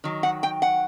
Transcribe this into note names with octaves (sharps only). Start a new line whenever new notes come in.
D#3 F#3
F#5
G5
F#5